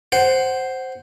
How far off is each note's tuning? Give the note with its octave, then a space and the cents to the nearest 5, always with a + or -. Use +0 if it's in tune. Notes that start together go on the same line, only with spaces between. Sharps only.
C5 +0 F#5 +15